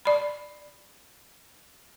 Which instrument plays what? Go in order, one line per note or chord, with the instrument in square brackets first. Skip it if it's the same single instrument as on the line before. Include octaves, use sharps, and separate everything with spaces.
[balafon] D5 B5